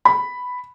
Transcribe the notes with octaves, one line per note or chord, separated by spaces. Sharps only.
B5